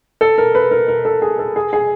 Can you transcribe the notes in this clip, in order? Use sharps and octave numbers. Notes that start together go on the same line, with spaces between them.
A4
A#4
B4
A#4
A#4
A4
G#4
A4
G#4
G#4